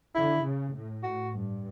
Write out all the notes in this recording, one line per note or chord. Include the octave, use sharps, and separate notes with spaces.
D3 E4
C#3
A2
F#4
G2